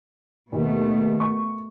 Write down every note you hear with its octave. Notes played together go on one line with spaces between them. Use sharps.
D#2 B2 A3
C#6